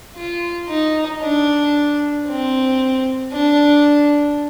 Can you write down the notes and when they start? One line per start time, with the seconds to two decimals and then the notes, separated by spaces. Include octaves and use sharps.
0.16 F4
0.69 D#4
1.22 D4
2.27 C4
3.33 D4